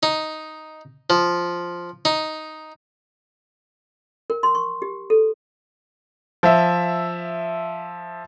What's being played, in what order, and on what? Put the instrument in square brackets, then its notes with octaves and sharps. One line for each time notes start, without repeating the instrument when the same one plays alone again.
[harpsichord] D#4
F3
D#4
[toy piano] A#4
C6
C#6
G4
A4
[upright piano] F3 E5